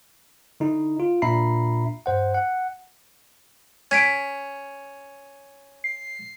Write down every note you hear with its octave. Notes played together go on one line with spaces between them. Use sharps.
D3 D#4 E4
F4
A#2 D4 E5 A#5 B5 C7
G2 C5 F#5
F#5
C#4 G#6 B6 D7
C7